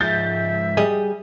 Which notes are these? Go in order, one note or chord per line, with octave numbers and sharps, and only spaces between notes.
G#2 F3 G#3 E5 G6 A6
G3 G#4 D#5